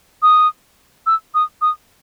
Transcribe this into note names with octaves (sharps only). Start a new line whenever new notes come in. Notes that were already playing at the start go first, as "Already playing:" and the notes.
D#6
E6
D#6
D#6